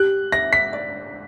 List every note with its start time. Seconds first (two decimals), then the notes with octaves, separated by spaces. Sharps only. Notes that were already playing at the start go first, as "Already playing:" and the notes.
Already playing: G4 F#6
0.32 E5 A#6
0.53 B6
0.73 D5